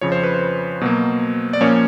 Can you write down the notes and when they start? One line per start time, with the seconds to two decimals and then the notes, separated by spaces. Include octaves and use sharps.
0.01 F2 C#3 F3 C#5
0.12 C5
0.23 B4
0.34 C5
0.81 B2 F#3 A#3
1.53 D5
1.61 A#2 F3 A#3 C#4 C#5